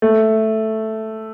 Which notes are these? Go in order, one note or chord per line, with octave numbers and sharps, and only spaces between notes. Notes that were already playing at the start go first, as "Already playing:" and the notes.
A3